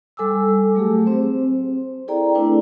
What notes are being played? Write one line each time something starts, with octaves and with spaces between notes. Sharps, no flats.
G3 A4 G#5 D6 E6
F#3 A3 G4 G#4
C4 C5
E4 G#4 A4 D5 G5 A#5
A3 C4 D4 E4 B4